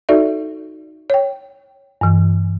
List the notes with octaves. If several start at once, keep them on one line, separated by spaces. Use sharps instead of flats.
D#4 F#4 A4 D5 E5
C#5 G5
G2 E3